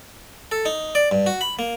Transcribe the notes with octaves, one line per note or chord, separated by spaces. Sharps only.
A4
D#4
D5
G2
F#4
B5
A#3